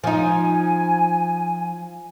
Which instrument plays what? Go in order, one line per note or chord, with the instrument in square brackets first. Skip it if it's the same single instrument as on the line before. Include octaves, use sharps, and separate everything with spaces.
[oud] F3 D#4 [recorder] G#5